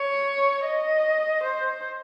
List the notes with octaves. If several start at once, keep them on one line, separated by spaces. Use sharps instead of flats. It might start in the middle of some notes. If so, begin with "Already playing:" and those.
Already playing: C#5
D#5
C5